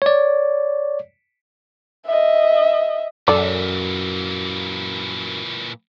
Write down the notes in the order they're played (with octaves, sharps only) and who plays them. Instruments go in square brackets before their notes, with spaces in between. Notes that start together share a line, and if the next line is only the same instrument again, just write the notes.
[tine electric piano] C#5 D5
[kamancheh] D#5 E5
[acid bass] F#2 [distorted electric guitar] A#2 E3 [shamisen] A4 D5